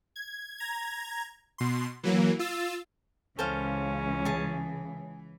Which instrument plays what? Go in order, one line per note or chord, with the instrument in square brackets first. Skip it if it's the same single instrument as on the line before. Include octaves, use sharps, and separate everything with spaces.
[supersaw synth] G#6
A#5 G#6
B2 C6
E3 F#3 A#3
F4 E6 A6
[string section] C#2 C#3 [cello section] E3 [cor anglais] C#4 [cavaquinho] A4 C5 F5
[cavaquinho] G#4 A5